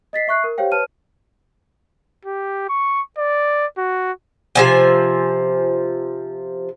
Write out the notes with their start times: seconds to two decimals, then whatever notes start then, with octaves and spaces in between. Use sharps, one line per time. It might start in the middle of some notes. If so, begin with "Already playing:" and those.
0.13 D#5 A6 B6 C7
0.28 E5 C#6 F#6 C7
0.44 A#4
0.58 G4 C5 C#5 F5 G5
0.72 B4 C#5 A5 F6 D#7
2.25 G4
2.69 C#6
3.18 D5
3.78 F#4
4.55 C3 F3 G#5